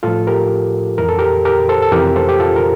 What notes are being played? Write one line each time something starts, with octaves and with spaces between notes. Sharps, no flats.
A2 F3 F4 A4
G4 A#4
F2 E3 A#4
A4
G4 A#4
G4 A#4
A4 C5
A4
F2 C3 E3 G4 A#4
A4 C5
G4
F4 A4
A#4